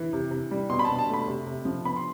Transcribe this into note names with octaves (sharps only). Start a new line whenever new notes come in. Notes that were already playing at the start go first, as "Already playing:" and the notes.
Already playing: E3
C3
C3
G3
B2 C6
B5
B2 A5
A5
A3 B5
C3
C3
F3
B3 B5
C6